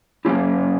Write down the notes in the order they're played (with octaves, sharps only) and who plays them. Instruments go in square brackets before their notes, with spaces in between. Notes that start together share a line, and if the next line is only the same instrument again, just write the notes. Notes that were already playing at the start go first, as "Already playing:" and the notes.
[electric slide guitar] F#2 D3 A#3 C#4 E4 G4